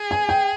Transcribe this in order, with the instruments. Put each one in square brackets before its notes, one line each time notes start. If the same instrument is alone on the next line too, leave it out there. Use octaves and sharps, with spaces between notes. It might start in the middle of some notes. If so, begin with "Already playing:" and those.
Already playing: [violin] G#4
[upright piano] G#5
G5